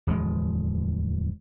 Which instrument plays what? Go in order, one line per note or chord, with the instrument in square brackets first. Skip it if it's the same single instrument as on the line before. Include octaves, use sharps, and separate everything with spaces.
[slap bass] D1 E2 F3 G#3